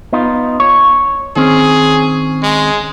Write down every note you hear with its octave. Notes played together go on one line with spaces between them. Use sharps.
B3 D#4 F4
C#5
D#3 C4 C#4 G#4
G#3